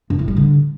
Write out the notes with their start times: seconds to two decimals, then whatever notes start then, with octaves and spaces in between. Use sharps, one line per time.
0.10 G2
0.19 A2
0.28 G3
0.37 D3